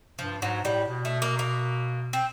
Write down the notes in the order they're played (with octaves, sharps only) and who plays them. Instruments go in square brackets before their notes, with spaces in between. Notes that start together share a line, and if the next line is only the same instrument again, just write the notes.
[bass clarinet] G2 [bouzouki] F3
[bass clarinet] G#2 [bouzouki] F#3
[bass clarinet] A2 [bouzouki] G3
[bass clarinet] B2
[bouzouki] A3
A#3
A#3
C4